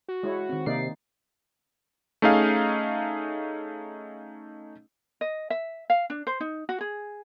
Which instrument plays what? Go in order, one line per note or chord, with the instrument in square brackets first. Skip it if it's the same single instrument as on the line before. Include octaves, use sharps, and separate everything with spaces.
[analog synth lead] F#4
[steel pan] G#3 E4 C#5
[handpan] D#3 C4
[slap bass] C3 [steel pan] A#3 D#4 D5 [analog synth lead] C7
[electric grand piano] A3 C#4 D#4 G#4 F5
[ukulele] D#5
E5
F5
D4
C5
D#4
F#4
G#4